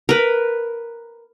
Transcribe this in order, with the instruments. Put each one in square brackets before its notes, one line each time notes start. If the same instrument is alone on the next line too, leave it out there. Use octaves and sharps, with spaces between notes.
[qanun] A#4 B4